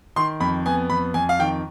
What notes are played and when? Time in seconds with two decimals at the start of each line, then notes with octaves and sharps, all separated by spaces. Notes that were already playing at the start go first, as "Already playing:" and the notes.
0.16 D#3 C6
0.40 F2 B5
0.66 B3 G#5
0.90 F2 B5
1.14 F2 G#5
1.29 F5
1.39 D#3 G5